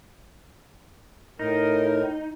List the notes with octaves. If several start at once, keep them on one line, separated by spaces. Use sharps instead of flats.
A2 D#4 A#4